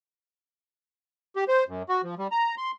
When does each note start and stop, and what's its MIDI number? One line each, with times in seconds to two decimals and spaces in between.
1.36 1.44 67
1.48 1.64 72
1.68 1.83 42
1.89 2.02 66
2.03 2.15 53
2.18 2.28 55
2.31 2.55 82
2.58 2.72 84